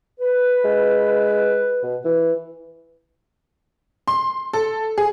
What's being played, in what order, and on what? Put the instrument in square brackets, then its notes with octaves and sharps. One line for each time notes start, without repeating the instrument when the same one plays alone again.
[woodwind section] B4
[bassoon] G#3
B2
E3
[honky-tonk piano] C6
A4
G#4